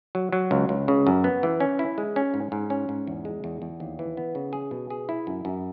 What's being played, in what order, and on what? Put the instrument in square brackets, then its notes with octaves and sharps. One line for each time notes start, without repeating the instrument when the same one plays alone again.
[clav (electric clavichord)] F#3
F#3
C#2
C#2
C#3
F#2
B3
E3
C#4
E4
G#3
C#4
G#2
G#2
C#4
G#2
E2
G#3
E2
E2
D#2
E3
B3
C#3
G#4
B2
G#4
E4
F#2
F#2